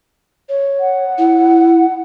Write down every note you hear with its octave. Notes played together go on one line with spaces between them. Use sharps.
C#5
F#5
E4